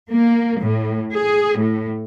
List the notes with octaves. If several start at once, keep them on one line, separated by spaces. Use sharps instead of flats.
A#3
A2
G#4
A2